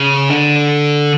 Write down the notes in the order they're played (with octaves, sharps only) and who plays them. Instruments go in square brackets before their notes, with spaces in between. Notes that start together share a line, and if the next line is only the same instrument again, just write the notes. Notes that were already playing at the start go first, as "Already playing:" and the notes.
Already playing: [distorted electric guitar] C#3
D3